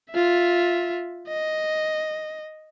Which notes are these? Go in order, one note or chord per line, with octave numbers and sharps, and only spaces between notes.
F4 E5
D#5